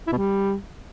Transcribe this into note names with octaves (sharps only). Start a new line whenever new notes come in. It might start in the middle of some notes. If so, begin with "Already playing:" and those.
E4
B2
G3